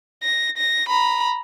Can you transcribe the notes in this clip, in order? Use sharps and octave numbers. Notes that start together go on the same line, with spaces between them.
A#6
A#6
A#5 B5